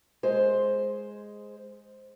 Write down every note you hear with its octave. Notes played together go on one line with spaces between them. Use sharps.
G#3 C5